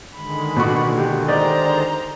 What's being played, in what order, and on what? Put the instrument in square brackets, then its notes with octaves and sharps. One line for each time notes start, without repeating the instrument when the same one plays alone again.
[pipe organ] D3 D#3 G#3 [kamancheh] B5
[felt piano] B2 C#6 [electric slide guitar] A#3 D4 F#4
[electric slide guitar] A#2 G4
[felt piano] G4 D#5 [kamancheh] C5 A#5 [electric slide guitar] D5